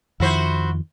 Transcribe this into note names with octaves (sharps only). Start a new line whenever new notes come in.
F2 D#3 F3 E4 F#4 C5